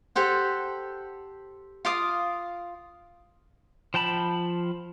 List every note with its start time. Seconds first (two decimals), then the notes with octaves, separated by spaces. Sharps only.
0.15 G4 A4 C5 F#5
1.85 F4 F5 D6 D#6
3.94 F3 G5 A5 B5